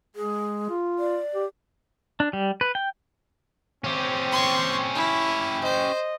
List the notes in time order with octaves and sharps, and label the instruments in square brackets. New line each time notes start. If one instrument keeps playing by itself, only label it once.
[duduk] G#3 [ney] G#4
[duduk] F4
[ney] D5
[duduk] G4
[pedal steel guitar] D4
G3
B4
G5
[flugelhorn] C4 [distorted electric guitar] C#4 G4
[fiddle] C6 C#6
E4
[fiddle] C5 [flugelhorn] D#5